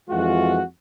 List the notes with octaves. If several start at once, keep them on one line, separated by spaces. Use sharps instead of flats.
F2 E3 G#3 F4 F#4